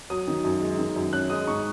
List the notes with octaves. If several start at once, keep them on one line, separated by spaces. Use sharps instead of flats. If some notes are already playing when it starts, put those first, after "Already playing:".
F#3 D#6
D#3
F#2
G#3
D#3
F#2
C#4 F#6
G#3 D#6
G#2 C#6